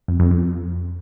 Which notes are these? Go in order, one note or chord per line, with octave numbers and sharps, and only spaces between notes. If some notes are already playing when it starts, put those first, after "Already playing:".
F2
F2
F2